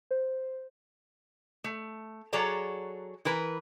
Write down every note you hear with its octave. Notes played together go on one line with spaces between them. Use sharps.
C5
A3
F#3 G#4 A4 C#5 D5 A#5
E3 A#4 B4